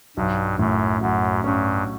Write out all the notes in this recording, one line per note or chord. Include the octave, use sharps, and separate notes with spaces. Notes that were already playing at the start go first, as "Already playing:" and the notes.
B1 G2
F#2 A2
F#2 F#3
G2 C#4